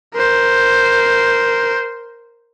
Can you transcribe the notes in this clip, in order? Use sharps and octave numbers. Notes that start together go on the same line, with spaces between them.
A#4 C5